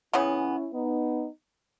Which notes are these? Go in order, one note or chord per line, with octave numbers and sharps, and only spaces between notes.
C#3 E3 B3 C#4 E4
B3 D#4